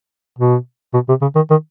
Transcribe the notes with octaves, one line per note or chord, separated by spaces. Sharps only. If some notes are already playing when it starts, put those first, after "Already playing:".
B2
B2
C3
C#3
D#3
D#3